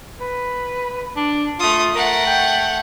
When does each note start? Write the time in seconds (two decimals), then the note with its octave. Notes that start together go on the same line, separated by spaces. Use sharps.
0.21 B4
1.16 D4
1.60 A3 F4 D#6
1.95 A3 A#4 F#5
2.27 G5